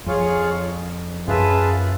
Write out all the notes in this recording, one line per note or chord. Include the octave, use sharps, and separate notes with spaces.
F2 F4 G#4 C#5 F5
F#2 F4 G#4 B4 E5 A5